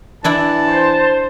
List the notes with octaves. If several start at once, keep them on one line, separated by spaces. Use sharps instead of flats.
E3 D4 E4 D5 A5
C5